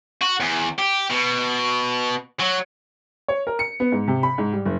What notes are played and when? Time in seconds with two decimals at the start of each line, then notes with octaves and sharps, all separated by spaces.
0.21 F#4
0.40 E2
0.79 G4
1.10 B2
2.40 F#3
3.28 C#5
3.47 A#4
3.59 C#7
3.80 B3
3.92 G#2
4.08 C3
4.23 B5
4.38 G#2
4.53 G3
4.66 F#1